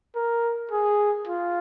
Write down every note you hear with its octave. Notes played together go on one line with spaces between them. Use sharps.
A#4
G#4
F4